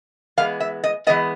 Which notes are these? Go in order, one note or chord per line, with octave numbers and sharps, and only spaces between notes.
E3 G#3 B3 F5
E5
D#5
E3 G#3 B3 D#5